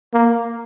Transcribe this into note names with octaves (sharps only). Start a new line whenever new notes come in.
A#3